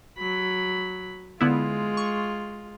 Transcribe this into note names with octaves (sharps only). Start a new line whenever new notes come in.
F#3 B5
D3 G#3 B3 E4 F4
C#6